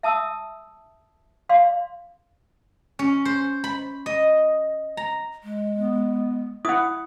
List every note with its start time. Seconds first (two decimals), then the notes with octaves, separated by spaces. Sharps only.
0.03 E5 A5 D#6 E6
1.49 D5 F5 C6
2.99 C#4
3.25 C5
3.64 B5
4.06 D#5
4.97 A#5
5.43 G#3
5.74 B3
6.65 E4 F#5 D#6